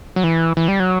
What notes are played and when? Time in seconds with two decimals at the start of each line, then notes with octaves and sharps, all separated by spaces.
0.16 F#3
0.24 E3
0.57 E3
0.68 G3
0.80 F#3